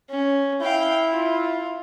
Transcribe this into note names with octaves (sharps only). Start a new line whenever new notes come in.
C#4
E4 F5 G5
F4